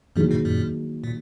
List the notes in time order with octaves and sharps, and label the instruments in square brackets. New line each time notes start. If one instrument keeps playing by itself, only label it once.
[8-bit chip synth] F#2 A#2 [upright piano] D#3 F#3 A#3 D#4 G#4
[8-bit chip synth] G#2 B2
F#2 A#2
A#2